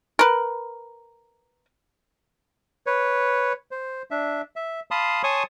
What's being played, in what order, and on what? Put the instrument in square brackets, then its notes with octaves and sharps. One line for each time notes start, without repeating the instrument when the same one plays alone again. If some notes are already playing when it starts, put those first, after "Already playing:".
[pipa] A#4 B4
[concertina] B4 C#5
C5
D4 E5
E5
F5 A5 B5 C6 D#6
C#5 G#5 A5 C6 C#6 D#6